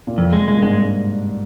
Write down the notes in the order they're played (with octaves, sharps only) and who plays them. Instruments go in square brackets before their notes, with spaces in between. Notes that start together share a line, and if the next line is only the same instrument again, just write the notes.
[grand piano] A#2
[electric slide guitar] F2 [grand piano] C3
[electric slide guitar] G#3
[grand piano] A#2 [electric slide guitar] G#3
[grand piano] G2
[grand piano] G#2 [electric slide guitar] G#3